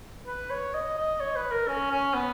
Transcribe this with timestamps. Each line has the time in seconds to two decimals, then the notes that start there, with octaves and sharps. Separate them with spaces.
0.27 B4
0.50 C#5
0.74 D#5
0.98 D#5
1.20 C#5
1.36 B4
1.51 A#4
1.68 C#4
1.91 C#4
2.14 B3